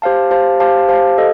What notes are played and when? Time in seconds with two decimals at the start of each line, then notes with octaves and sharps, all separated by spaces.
0.02 G4 C5 F5 A5
0.31 G4 C5 F5 A5
0.60 G4 C5 F5 A5
0.89 G4 C5 F5 A5
1.18 A4 D#5